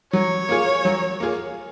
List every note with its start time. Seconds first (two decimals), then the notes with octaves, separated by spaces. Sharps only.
0.13 F#3 C#5
0.49 A#3 F4 G#4
0.85 F#3
1.20 A#3 F4 G#4